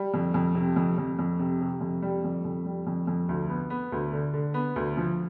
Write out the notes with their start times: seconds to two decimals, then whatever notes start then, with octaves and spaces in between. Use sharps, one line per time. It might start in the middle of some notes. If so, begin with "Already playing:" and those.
Already playing: G3
0.14 F2
0.34 F2
0.55 C3
0.76 F2
0.98 F2
1.19 F2
1.39 C3
1.61 C3
1.81 F2
2.02 G3
2.24 F2
2.45 F2
2.65 G3
2.87 F2
3.07 F2
3.29 D2
3.49 B3
3.70 B3
3.92 D2
4.13 D3
4.33 D3
4.54 B3
4.76 D2
4.97 F3